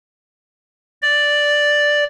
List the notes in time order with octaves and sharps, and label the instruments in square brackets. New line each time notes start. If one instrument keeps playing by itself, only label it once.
[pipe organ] D5